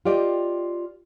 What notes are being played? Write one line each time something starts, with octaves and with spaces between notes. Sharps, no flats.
F4 G4 D5 D#5 G5